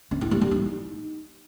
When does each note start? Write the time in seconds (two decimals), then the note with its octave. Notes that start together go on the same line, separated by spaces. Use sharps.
0.11 C#4
0.21 E4
0.31 G3
0.41 G3
0.51 D#4